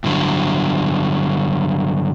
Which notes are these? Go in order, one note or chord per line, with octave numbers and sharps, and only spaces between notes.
G2 D3 F#3